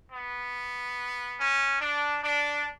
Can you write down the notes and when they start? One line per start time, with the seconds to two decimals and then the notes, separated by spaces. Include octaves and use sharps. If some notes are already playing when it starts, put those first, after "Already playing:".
0.12 B3
1.39 C#4
1.82 D4
2.23 D4